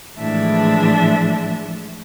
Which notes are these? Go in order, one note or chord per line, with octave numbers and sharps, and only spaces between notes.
A2 E3 F3 G#3 D4 E5